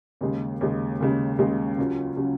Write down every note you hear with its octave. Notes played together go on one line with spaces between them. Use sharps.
D#2 C#3 G#3
D#2 C#3 G#3
D#2 C#3 G#3
D#2 C#3 G#3
C#2 C#3 F#3 C#4 F4
C#3 F#3 C#4 F4